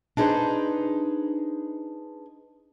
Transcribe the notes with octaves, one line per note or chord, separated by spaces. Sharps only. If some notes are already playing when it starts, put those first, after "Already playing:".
D4 D#4 G#4 B4 C5